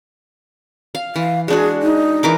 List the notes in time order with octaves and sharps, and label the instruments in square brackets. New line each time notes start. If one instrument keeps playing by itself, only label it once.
[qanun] F5
[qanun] E3 [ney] F5
[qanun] G#3 D4 F#4 [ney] G#4
[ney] D#4
[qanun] E3 A#4 D6